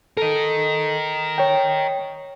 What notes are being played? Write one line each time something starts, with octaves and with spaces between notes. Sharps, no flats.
A4 A#4 D#5
C#5 G5